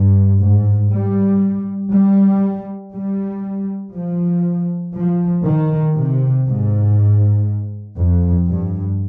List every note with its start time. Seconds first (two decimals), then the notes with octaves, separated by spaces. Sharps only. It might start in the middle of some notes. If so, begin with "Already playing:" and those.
Already playing: G2
0.42 G#2
0.93 G3
1.93 G3
2.94 G3
3.94 F3
4.96 F3
5.45 D#3
5.96 C3
6.46 G#2
7.97 F2
8.48 G2